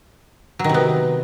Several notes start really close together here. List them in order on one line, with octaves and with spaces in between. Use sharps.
F#3 D#3 C3 B3